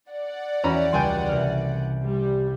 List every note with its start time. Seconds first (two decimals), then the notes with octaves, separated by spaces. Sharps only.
0.10 D5 F#5
0.64 E2 C#4 F#4 A#5 B5
0.93 C#2 G3 G5 G#5 C6
1.29 C2 F6
2.04 G3